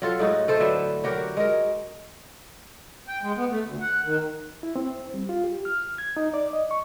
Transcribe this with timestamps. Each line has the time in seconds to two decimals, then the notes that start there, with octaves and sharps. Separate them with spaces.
0.02 F#3 F4 A4
0.19 A2 G#3 D#4 F#4
0.48 A3 A4 C5
0.60 D3 F#3 B4 E5
1.04 F#3 F#4 G4 A#4
1.37 G#3 A#4
3.08 G5
3.22 G#3
3.36 B3
3.49 A3
3.66 D2
3.81 F#5
4.05 D#3
4.63 E4
4.76 C4
5.14 G3
5.29 F4
5.44 G4
5.65 F6
5.98 G#6
6.17 D#4
6.34 D5
6.53 D#5
6.71 C#6